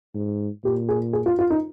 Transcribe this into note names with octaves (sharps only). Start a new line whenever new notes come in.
G#2
A#2 G4
G#4
G#4
F4
F4
D#4